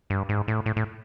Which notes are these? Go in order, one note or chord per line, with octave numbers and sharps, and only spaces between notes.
G2
G#2
A2
A2
A2